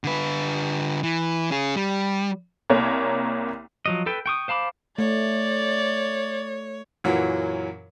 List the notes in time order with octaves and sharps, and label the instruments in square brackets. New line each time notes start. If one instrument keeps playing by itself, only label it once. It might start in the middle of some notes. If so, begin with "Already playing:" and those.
[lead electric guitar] D3 B4
E3
C#4 G#4
G3
[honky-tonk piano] C2 A#3 C#5
[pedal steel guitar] F3 F#3 D#5
A4 B4 G5
G5 C#6 D#6
C5 F5 A5 B5 D6
[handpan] A3 [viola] C#5 [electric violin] D5
[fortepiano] F#2 A#2 E3 F#3